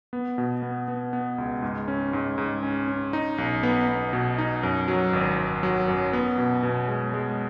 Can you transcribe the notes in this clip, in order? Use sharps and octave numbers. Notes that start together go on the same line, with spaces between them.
B3
B2
B3
B3
B3
C#2
G#2
C#4
G#2
G#2
C#4
C#4
D#4
B1
B3
B3
B2
D#4
F#2
F#3
G#1
G#1
F#3
F#2
B3
B2
B2
G#3
G#3